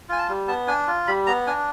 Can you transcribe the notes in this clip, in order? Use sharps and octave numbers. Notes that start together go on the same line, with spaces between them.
F4 G#5
A5
G3
B3 A5
D4 G#5
F4
G3 B5
B3 A#5
D4 G#5